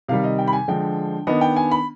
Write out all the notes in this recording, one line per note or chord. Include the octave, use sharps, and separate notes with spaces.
C3 D#3 G3 F5
D#5
G5
B5
G#5
D3 F3 G#3 G5
D#3 B3 D4 D#5
G5
G#5
B5